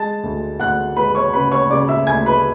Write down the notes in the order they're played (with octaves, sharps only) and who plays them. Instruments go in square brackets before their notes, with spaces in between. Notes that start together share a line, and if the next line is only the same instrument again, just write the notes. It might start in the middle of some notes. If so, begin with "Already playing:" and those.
Already playing: [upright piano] G#3 A5 A6
D2
D2 F#5 F#6
G#3 B4 B5
C#5 C#6
C#3 B4 B5
C#5 C#6
C#3 D5 D6
E5 E6
D2 G#5 G#6
B4 B5